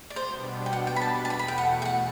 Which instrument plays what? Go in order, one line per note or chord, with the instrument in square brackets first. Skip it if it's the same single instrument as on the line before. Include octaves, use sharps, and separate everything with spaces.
[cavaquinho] D5
[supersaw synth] B2 G3 B3 D4 [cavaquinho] C5
[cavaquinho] G5
F#5
G5
B5
A5
A5
[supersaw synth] E2 B2 A3 [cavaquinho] B5
[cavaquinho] B5
G5
F#5
G5
F#5